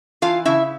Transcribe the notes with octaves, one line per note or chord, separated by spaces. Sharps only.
E3 F4 F5
C#3 E4 E5